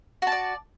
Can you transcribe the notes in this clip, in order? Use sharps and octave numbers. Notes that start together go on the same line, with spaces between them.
F#4 D5 A5